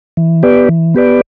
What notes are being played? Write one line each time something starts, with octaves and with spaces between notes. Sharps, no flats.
E3
B3 G4 B4 D5
E3
B3 G4 B4 D5